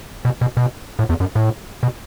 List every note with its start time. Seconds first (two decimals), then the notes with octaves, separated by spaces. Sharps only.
0.25 B2
0.41 B2
0.57 B2
0.99 A2
1.09 E2
1.20 F#2
1.35 A2
1.83 B2